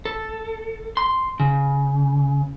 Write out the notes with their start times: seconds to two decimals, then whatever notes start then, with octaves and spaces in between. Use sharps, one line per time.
0.05 A4
0.97 C6
1.40 C#3